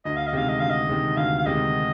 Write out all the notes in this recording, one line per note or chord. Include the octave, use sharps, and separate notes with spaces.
D2 D#5
F5
D#5
C3 D#3 G#3 F5
D#5
D2 F5
D#5
C3 D#3 G#3
D2 F5
F5
C3 D#3 G#3 D#5